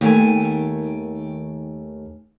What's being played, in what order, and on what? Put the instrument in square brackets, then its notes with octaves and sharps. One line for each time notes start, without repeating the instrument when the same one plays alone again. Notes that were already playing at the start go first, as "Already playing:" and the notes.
[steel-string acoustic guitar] D#2 D#3 A3 G#5